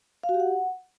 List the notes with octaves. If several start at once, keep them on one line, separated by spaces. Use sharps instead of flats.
F5
F#4
G4
F#5